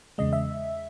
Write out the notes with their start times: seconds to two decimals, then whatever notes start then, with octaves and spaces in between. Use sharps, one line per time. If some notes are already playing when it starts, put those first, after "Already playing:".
0.18 E2 C#3 G#3 D#5
0.33 E5